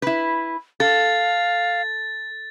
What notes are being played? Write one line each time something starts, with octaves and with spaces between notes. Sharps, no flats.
E4 B4
A4 F5 A6